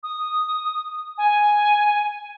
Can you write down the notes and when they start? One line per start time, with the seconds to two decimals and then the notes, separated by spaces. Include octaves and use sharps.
0.03 D#6
1.18 G#5